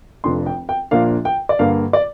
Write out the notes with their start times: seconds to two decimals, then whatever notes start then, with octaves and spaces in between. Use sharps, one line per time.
0.24 F1 F2 F3 D4 F4 C6
0.46 G5
0.69 G5
0.91 A#1 A#2 F3 A#3 D4 F5
1.25 G5
1.49 D5
1.59 G2 D3 A#3 F5
1.93 D5